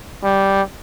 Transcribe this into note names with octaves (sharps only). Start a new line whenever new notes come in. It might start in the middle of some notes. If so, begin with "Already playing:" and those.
G3